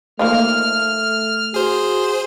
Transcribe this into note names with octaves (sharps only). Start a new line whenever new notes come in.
D#3 F3 A3 A#3 F6
F#4 G#4 C5